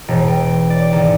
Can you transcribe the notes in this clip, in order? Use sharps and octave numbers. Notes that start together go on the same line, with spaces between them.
E1
G5
D5
G#1